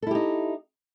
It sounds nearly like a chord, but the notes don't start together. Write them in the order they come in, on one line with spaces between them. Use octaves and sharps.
A4 E4 G4 D#4